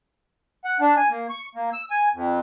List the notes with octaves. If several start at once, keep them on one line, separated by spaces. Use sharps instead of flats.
F#5
D4
G#5
A#3
C#6
A#3
E6
G#5
F2